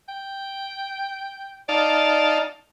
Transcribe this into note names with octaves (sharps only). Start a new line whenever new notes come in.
G5
D#4 D5 F5 A5